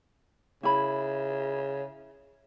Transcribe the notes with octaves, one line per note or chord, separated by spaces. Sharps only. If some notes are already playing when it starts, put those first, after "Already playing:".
C#3 E4 B5